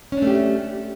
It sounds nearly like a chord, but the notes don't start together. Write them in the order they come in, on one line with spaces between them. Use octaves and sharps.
C#4 D4 A3 G4